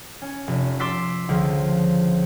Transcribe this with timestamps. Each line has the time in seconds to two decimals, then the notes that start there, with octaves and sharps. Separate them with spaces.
0.22 C#4
0.47 F1
0.79 C6 D6 E6 A6 B6 C7
1.29 C#2 D3 F3